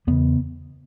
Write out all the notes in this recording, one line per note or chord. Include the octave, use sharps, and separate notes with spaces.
E2 C#3 B3